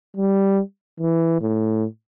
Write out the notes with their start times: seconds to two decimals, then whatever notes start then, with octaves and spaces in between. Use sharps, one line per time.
0.17 G3
1.00 E3
1.41 A2